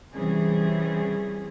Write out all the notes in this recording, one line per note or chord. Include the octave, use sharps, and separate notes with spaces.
C3 E3 G3 C#4 G#4